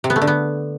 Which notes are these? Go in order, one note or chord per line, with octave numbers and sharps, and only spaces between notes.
C3
B3
A3
D3
B3